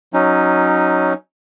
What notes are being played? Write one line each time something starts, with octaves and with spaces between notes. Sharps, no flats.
F#3 C#4 D#4